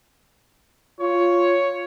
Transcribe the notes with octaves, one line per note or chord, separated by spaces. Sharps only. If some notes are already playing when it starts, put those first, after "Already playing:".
F4 C#5